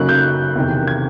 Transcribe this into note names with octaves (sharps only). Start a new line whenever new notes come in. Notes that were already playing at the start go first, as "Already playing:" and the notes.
Already playing: F#2 C#3 F#3 A#3 D#4 F#6
G6
E2 C3 D#3
G#6